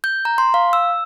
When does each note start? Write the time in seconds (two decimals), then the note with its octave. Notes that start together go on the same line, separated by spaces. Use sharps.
0.04 G6
0.25 A#5
0.38 C6
0.54 F5
0.73 E6